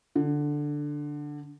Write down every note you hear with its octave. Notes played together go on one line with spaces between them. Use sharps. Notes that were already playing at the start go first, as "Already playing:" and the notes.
D3